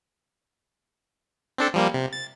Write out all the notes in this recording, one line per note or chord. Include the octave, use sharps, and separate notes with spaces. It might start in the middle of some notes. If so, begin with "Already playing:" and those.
C4 D4 A4
F3 G3 A#3
C3
A6